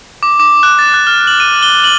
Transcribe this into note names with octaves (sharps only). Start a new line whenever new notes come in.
D6
D6
F#6
A6
F#6
F6
F#7
D#7
G7
F#7